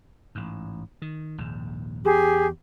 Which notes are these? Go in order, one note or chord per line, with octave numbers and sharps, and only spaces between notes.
A1 G#2
D#3
A#1 D#2 G#2
E2 G4 G#4